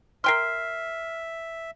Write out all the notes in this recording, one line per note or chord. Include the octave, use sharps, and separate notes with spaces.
A#4 E5 G5 C6 F6 C7